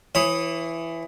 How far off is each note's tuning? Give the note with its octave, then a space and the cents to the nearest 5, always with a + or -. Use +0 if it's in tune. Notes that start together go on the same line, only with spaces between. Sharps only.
E3 +10 C#5 -30 D#6 +10